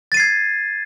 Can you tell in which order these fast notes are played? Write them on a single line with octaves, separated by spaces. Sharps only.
A6 D#7 C7 G#6